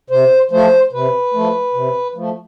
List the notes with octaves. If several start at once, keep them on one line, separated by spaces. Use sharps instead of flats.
C3 C5
F3 A3 C5
C3 B4
F3 A3
C3
F3 A3